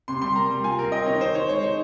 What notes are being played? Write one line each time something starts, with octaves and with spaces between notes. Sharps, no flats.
C3 C6
G3 C6
A#3 A#5
G3
F4 G#5
C4 A#4
C4 D#5
D#3 C#5
D#4 C5
D#4 C#5
G#3 C#5
D#4